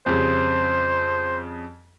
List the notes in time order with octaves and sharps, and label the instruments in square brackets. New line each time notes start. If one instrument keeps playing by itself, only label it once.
[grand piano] F2 C#3 G3 [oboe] C5